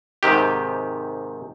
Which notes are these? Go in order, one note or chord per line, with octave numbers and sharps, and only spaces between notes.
G#2 C3 D#3 G4